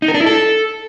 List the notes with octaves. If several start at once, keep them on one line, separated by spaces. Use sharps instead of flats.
D#4
A#4
D4
E4
A4